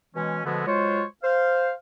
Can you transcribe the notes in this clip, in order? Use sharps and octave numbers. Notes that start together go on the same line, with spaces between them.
B2 E3 G#3 C#4
B2 D3 F3 G#3 A3 B3
F#3 G#3 F4 C5 C#5
C5 F5